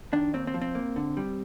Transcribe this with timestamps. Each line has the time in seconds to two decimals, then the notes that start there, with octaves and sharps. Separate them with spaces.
0.13 D#3 D4
0.34 D#2 C4
0.47 C4
0.54 F3
0.61 C4
0.75 A#3
0.96 D3
1.17 G3